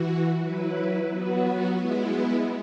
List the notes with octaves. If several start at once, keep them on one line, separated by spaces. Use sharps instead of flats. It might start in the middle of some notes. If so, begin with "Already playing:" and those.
Already playing: E3 F#4
F#3 E4 B4
F#3 B3 F#4
G#3 B3 E4